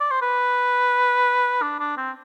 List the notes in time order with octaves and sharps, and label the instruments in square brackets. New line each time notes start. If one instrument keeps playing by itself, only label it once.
[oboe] D5
C5
B4
D4
D4
C4